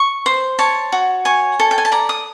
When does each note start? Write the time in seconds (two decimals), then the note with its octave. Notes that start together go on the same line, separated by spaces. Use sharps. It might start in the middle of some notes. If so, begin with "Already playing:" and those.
Already playing: C#6
0.26 C5
0.59 C#5 A5
0.92 F#4
1.25 C#5 G#5
1.60 A4
1.71 G5
1.78 G#5
1.85 A5
1.92 D5 A#5
2.09 D#6